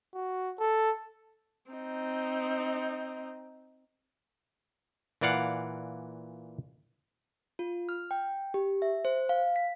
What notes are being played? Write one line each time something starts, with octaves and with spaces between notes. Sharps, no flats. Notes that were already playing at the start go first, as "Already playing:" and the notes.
F#4
A4
C4 D#4
A#2 E3 D5 F5 F#5
F4
F6
G5
G4
E5
C5
F5
B6